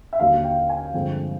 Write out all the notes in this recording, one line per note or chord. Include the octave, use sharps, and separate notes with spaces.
E5
D#2 D3 F#3 F5
G5
G#5
G1 F2 D3 F3 G#3 G5